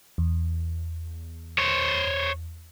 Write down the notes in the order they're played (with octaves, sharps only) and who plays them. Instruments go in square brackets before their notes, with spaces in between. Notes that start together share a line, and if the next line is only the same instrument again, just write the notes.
[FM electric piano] E2
[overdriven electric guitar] C5 C#5